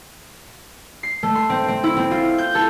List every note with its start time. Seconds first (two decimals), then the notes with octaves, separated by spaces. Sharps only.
1.03 C7
1.23 A3
1.35 C6
1.50 C4
1.68 C4
1.84 E4
1.97 C4
2.11 F4
2.38 G6
2.55 A4